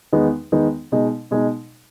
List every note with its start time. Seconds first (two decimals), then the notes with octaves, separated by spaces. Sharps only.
0.13 E2 D#3 G#3 B3 D#4
0.52 E2 D#3 G#3 B3 D#4
0.92 B2 G#3 D#4
1.31 B2 G#3 D#4